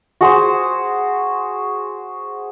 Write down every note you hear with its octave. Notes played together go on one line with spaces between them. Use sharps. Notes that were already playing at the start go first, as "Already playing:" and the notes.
F#4 G#4 C5